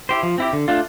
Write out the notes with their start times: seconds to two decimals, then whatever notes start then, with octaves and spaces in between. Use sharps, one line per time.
0.09 E4 G4 C5
0.23 F3
0.38 C4 E4 G4
0.53 D3
0.68 A3 D4 F4